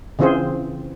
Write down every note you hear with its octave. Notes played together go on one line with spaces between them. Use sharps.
C#3 E3 C4 F4 G#4 C5